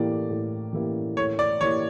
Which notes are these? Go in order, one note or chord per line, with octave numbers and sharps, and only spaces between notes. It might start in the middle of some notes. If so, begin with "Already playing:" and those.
Already playing: A2 E3 A#3 E4 G4 D5
A2
E3 A#3 E4 G4
A2 C#5
D5
E3 A#3 E4 G4 C#5